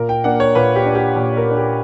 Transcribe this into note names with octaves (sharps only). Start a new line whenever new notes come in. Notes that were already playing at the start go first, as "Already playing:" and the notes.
Already playing: A#2 A#4
G5
A#3 D4 F#5
C#5
A#2 B4
G4
D4
A#3 G4
A#2
A#4
A#3 D4
G4